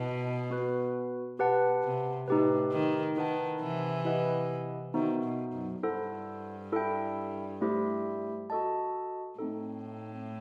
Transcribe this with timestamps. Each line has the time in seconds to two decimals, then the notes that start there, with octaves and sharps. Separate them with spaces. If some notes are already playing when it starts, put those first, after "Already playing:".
Already playing: B2 E4 B4 D#5 A5
0.50 B3 F#4 B4
1.39 B2 G4 B4 F#5 A5
1.83 C3
2.27 A2 D#4 G4 B4
2.72 D#3
3.16 D#3 E4 B4 F#5 A5
3.61 C3 E3
4.05 E4 G4 B4 D#5 F#5
4.94 D#3 B3 D#4 F#4 C5 E5
5.24 B2
5.53 F#2
5.83 G2 E4 A4 C5 F#5
6.72 E4 A4 E5 G5
7.61 A3 E4 G4 C5 E5
8.50 F#4 A4 D#5 A5
9.39 A2 A3 C4 D#4 A4